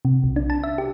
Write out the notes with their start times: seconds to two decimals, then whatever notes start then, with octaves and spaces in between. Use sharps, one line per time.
0.05 C3
0.24 B1
0.36 D4
0.50 A5
0.64 E5
0.78 G4